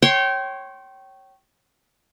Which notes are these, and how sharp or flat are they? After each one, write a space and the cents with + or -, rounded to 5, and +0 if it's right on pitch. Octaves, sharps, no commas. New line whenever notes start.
C#5 -15 G5 -25 C6 +10